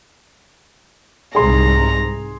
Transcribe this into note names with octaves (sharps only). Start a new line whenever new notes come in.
C2 G#2 G#4 A#5 C6